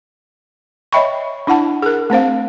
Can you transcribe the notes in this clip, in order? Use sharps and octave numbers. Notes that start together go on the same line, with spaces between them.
C#5 D#5 E5 G5 B5 C#6
D4 E4 F#5 A5
G#4 A#4
A3 C4 C5 F5